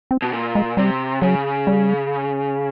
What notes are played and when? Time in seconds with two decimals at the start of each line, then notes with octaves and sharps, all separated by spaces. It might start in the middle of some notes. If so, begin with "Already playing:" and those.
0.11 C4
0.22 B2
0.33 A#2
0.55 G#3
0.77 C3 G3
1.22 C#3 F#3
1.67 G3